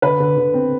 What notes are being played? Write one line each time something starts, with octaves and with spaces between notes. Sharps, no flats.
D3 B4
D3
D3
C4